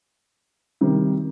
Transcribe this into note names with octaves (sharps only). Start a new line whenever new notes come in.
C3 D#3 G3